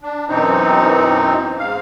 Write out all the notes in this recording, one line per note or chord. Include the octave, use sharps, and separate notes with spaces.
D4
F#2 B2 E3 C4 D#4
G#2 F5